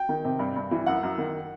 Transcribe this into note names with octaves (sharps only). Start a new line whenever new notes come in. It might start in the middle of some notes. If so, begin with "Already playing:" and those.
Already playing: G5
D#3
C3
G2
G2
E3
F#2 F#5
F#2
D#3